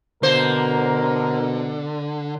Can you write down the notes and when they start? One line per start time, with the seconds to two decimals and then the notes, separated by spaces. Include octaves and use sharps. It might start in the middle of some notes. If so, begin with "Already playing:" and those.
0.23 B2 D3 A#3 A#4 C5